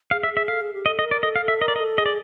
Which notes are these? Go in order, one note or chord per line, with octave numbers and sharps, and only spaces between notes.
G#4 F5
E5
G#4
E5
A4 F5
G#4
G4
A4 D#5
D#5
A#4
D5
A4 D#5
F5
A4
E5
A#4 D#5
D5
D#5
A4
G#4 D#5
D5